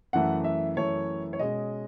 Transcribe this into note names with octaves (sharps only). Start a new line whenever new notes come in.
F#2 E3 A3 F#5
E5
F#2 E3 A3 C#5
C#5
B2 G#3 C#4 D#5